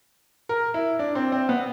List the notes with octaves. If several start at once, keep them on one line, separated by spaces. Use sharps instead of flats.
A#4
E4
D4
C4
C4
B3